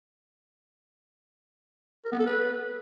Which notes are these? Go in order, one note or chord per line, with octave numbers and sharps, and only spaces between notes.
A#4
B3
A4
B4